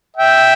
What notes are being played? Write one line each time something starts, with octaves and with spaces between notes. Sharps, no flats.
E5 G5